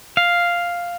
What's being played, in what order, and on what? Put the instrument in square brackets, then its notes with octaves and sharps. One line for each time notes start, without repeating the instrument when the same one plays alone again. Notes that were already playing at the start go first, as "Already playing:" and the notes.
[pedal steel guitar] F5